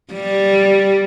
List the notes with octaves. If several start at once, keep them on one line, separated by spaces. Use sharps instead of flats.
G3